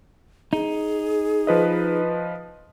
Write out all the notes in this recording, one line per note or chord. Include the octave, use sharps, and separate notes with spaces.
D#4 G#4
F3 B4 D#5